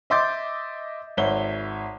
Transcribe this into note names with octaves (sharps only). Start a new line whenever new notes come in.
D#5 E5 C6 D6 G6 A6
G#1 C#5 E5 G7